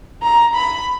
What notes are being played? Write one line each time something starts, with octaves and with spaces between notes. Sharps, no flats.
A#5
B5